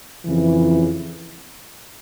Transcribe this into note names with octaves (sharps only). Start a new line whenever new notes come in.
F2 C#3 E3